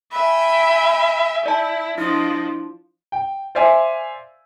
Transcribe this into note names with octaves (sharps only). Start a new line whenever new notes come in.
E5 G5 G#5 B5
E4 D5 A5
F3 D4 E4 D#5
G5
C5 D5 E5 F5 G#5